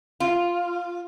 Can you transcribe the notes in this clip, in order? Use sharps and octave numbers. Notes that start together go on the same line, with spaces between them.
F4